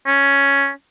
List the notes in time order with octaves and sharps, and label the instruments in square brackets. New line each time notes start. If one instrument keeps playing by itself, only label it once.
[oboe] C#4